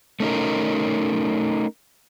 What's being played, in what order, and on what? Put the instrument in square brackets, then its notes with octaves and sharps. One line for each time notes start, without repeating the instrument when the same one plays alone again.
[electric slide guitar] A3 C#4 D#4 A#4